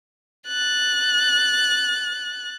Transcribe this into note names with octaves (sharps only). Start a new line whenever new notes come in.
F#6 A6